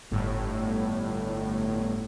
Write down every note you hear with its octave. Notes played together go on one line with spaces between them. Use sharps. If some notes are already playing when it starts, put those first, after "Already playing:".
G1 A2